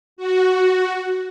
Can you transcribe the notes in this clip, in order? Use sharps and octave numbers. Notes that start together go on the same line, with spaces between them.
F#4